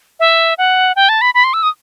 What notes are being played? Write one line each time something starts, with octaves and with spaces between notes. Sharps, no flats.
E5
F#5
G5
A5
B5
B5
C6
E6
D#6